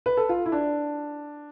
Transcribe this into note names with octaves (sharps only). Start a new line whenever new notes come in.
B4
A4
F4
E4
D4